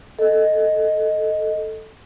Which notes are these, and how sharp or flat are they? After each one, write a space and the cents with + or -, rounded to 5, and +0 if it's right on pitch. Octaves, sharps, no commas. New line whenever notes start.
A4 +0 D#5 +0